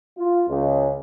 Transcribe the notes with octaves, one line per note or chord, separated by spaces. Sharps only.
F4
C#2